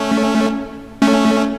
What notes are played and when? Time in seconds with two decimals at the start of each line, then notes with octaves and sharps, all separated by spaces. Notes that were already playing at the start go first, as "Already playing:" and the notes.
Already playing: A3 C#4
1.02 A3 C#4